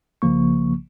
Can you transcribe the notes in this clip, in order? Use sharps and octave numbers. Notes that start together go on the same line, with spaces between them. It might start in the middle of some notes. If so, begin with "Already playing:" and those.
B1 C#3 F3 A#3 C#6